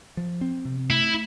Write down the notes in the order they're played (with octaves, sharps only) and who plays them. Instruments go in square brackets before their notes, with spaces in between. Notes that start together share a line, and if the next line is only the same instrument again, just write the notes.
[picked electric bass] F3
C4
C3
[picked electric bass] A3 [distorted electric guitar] E4